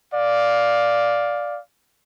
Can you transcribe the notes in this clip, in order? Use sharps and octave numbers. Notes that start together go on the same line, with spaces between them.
D5 F5